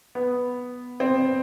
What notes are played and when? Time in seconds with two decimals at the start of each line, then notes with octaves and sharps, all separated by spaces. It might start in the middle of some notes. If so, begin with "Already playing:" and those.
0.15 B3
1.00 C4